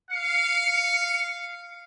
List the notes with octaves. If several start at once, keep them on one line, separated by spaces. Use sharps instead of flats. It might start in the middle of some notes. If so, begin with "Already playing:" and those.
F5 C#7